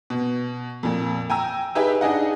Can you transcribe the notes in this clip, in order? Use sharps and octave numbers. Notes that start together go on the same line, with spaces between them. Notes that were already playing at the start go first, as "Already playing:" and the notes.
B2
F2 A#2
G5 G#5 A#5 E6
D#4 G4 G#4 B4 E5
D4 D#4 G#4 D#5 F#5